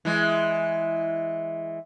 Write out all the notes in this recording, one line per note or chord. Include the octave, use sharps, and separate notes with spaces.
E3 G#3